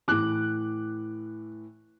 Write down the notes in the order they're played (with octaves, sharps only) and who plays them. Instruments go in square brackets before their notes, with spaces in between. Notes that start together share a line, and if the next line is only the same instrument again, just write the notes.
[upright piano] A2 E3 D6 F#6